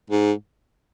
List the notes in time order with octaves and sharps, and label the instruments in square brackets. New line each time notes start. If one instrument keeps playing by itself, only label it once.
[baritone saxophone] G#2